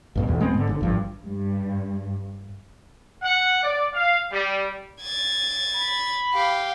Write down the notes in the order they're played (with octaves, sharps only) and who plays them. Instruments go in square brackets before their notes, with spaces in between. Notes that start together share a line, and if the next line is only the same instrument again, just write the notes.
[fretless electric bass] B1 G2 B2
B1 E2
G#3 B3 C4
G#2 D3
G1 A#2 D3
G#1 G2 F3
[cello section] G2
[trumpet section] F#5
D5
F5
G3
[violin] G#6 A6
[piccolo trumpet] B5
[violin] G4 F5